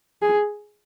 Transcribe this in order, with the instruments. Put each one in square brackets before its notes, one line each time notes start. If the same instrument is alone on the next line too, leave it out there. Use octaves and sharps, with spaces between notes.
[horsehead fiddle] G#4